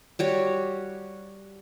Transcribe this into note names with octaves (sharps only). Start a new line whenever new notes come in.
G3 F#4 C#5